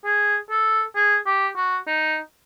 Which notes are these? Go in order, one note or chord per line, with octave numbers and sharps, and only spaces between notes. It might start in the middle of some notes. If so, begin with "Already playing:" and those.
G#4
A4
G#4
G4
F#4
D#4